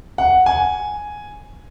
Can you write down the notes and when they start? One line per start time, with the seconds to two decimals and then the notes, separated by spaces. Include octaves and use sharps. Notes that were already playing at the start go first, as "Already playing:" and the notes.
0.18 F#5
0.46 G#5